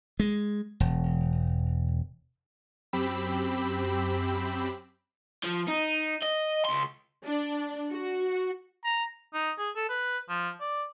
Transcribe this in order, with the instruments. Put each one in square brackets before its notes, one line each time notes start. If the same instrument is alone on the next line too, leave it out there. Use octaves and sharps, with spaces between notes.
[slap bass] G#3
E1
[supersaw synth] F#2 C4 G4 B5 E6
[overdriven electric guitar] F3
D#4
D#5
C#2 C6
[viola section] D4
F#4
[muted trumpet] A#5
[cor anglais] D#4
G#4
A4
B4
F3
D5